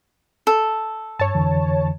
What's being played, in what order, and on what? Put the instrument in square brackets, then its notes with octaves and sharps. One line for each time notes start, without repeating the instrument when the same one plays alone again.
[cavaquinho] A4
[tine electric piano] G2 [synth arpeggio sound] C#5 A5
[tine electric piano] F2 D3 E3